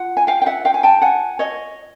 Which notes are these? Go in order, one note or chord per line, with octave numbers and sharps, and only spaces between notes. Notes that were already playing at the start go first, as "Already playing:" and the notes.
Already playing: F4 F#5
G#5
F5 G5
G5
E5 F#5
F5 G5
G#5
G5 A5
F#5 G#5
C#5 D#5